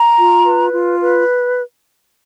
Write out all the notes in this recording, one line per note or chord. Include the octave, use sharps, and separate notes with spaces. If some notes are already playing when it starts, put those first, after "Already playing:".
Already playing: A#5
F4
B4
F4
B4